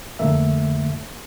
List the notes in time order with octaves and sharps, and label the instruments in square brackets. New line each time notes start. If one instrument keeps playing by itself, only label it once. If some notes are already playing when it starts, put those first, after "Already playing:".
[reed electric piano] F2 D3 A3 A#3 E5